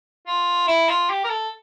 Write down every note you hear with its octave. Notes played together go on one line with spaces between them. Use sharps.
F4
E4
F4
G4
A#4
A4